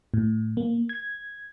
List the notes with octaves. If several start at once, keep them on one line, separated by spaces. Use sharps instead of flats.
A2
A#3
G#6